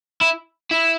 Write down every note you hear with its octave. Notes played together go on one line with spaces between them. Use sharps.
E4
E4